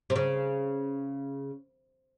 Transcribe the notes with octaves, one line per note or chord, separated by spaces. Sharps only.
C3
C#3